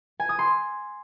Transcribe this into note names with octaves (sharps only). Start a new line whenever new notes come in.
G#5
D#6
C6